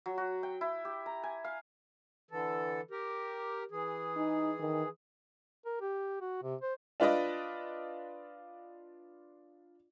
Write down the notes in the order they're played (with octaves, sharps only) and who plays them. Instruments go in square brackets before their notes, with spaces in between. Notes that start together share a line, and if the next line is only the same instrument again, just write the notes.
[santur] F#3
F#4
G5
E4
G4
A#5
G#5
F5
[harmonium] D3 E3 A4
G4 A#4
E3 G#4
[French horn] D#4
D#3
[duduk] A#4
G4
F#4
C3
C5
[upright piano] D4 F4 B4 D5 D#5